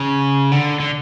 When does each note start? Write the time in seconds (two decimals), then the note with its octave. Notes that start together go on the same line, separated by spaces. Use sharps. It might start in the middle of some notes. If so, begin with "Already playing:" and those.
Already playing: C#3
0.52 D3
0.80 D3